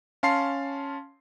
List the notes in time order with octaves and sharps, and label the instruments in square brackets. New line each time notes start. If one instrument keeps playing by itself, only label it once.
[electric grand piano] C#4 F5 A5 C6 C7